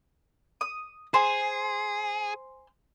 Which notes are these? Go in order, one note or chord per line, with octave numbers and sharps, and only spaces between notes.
D#6
G#4 C5 G#5